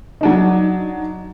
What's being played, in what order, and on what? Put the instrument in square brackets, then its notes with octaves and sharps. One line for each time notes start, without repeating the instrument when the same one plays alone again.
[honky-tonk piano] F#3 D4 D#4